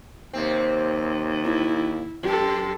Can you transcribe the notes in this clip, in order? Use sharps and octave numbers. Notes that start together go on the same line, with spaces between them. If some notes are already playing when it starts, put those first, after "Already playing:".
D#2 C3 C4
E4
F#2 G4 A4